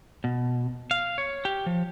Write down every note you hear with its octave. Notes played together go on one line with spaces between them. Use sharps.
B2
F5
C#5
G4
F3